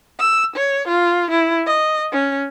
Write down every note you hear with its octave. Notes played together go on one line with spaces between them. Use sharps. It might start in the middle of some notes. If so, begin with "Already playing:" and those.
E6
C#5
F4
E4
D#5
C#4